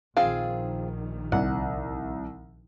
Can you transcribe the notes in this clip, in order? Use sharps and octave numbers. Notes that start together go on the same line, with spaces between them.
A#1 D#3 C4 F4 G#4 F5
C2 F#5